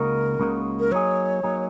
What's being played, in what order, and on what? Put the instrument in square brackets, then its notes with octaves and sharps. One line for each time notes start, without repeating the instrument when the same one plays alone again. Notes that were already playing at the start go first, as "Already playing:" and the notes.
Already playing: [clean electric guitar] C#2 C#3 A#3 D#4 F#4 [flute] A#4
[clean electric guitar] C#2 C#3 A#3 D#4 F#4
[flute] A#4
[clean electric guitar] F#3 A#3 D#4 G#4 [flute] C#5
[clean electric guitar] F#3 A#3 D#4 G#4